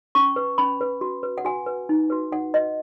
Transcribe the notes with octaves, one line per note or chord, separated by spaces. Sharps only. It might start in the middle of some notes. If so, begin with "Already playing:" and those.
C#4 C#6
B4
C#4 B5
B4
F#4
B4
F#5
F#4 G#5
B4
D#4
F#4 B4
D#4 F#5
F#4 B4 D#5